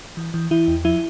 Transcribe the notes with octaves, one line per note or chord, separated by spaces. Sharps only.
E3
E3
E3 E4
E2
F3 E4